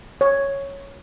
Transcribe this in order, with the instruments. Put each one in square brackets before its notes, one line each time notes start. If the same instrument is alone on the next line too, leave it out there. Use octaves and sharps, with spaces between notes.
[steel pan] C#5